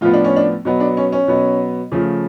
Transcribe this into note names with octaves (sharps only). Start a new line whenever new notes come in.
A2 F3 B3 F4
D4
C#4
D4
B2 F#3 B3
D4
C#4
C#4
B2 F#3 B3
C#3 F3 A3